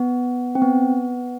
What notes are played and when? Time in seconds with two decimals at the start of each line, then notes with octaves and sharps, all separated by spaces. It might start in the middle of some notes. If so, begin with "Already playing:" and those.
Already playing: B3
0.55 C4
0.62 B3